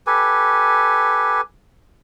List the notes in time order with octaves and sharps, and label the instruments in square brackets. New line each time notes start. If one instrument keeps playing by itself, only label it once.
[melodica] G4 A4 B4 G#5